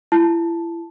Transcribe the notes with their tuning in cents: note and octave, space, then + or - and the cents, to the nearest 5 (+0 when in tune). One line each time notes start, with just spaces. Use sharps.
E4 +30 A5 +0